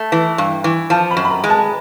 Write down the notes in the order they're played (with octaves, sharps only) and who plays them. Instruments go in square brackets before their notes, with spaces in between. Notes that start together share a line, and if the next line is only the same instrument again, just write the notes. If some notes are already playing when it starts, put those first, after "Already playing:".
Already playing: [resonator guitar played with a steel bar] A3
E3
G2
E3
[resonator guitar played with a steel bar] F3 [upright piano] A5
[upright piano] B5
[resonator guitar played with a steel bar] F#2
[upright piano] B5
A#5
[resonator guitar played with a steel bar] G#3
[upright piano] A5